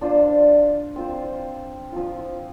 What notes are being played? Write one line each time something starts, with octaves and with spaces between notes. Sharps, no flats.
D4 F4 C5
C4 F4 C5
F3 C4 F4